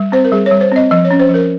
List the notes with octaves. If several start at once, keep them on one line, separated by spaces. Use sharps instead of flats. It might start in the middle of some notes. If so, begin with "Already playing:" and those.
Already playing: G3
C4 C5
A#4
G3 G#4
C#5
G3
C5
C4 D#5
F3 D#5
C#5
C#4
C5
F3
A#4